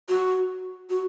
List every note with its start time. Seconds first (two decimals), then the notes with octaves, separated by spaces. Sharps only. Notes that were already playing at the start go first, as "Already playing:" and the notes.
0.09 F#4
0.90 F#4